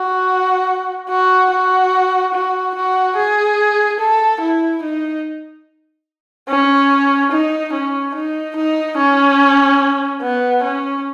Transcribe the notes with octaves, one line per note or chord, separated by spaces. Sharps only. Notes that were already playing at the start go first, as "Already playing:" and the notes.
Already playing: F#4
F#4
F#4
F#4
F#4
G#4
A4
E4
D#4
C#4
D#4
C#4
D#4
D#4
C#4
B3
C#4